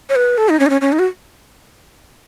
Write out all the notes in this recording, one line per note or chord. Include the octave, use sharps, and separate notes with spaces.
C#5
B4
A4
D#4
C#4
D#4
C#4
C#4
D#4
F#4